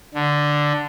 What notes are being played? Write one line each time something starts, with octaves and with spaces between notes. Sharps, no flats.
D3